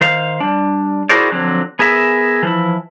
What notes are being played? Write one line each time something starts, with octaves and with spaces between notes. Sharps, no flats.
D#3 C5 F5
G3 D4
E4 F#4 G#4 A#4 C5 D5
D3 F3 F#3 C4
B3 G#4 A#4 E5
E3 F3 E4